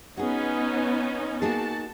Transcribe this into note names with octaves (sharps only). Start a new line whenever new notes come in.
B3 C#4 D#4 F#4 G#4
A#3 D#4 F#4 G#4 A5